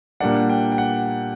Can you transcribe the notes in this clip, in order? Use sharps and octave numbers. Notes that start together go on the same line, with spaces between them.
A#2 G3 A#3 D4 F#5
G5
G5
F#5